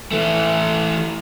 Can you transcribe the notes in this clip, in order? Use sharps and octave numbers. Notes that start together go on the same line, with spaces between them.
E3 A3